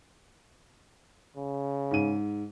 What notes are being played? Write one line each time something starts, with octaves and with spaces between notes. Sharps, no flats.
C#3
G#2 D#7